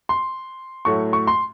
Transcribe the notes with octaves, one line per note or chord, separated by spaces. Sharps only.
C6
A2 F#3 A3 C#6
C#6
C6